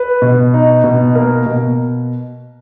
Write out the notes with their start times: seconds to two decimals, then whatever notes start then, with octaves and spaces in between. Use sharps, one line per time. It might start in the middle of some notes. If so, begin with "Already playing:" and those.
Already playing: B4
0.22 B2
0.54 D#4
0.84 B2
1.15 A#3 A#4
1.46 B2